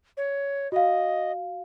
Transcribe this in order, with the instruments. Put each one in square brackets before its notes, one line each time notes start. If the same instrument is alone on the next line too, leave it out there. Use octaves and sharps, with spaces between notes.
[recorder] C#5
[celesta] F#4 F5 [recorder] D#5